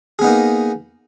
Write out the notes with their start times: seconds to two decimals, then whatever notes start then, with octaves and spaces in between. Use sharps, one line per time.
0.19 G#4
0.22 B3
0.24 D#4
0.27 A#3